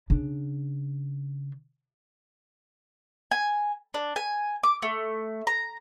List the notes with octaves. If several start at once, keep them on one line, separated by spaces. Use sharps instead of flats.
C#3 D4
G#5
D4
G#5
D6
A3
A#5